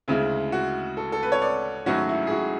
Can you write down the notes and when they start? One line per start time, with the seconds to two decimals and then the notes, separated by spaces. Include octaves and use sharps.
0.08 D2 C#3 G#3 E4
0.52 F#4
0.97 A4
1.12 A4
1.23 B4
1.32 C#5
1.42 D5
1.86 G#1 G#2 F#3 A3 C#4 F#4
2.09 E4
2.27 G#4
2.31 F#4